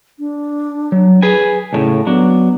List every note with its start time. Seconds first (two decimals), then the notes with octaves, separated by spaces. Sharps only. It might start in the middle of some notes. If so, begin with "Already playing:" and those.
0.19 D4
0.92 F#3
1.22 G#4 B4 G#5
1.73 D2 A2 C#3 A5
2.07 F#3 B3 D4